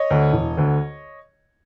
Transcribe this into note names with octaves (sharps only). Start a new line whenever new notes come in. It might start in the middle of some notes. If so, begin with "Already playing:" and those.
Already playing: C#5 D#5
D2 D3
E1
D2 D3